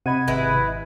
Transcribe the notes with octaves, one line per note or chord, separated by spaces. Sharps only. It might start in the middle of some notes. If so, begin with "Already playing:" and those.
C3 D#5 F#5 B5 G#6 D#7
G#1 G#3 E4 B4